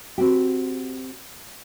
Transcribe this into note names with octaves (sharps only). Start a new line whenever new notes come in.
C4 F#4 G4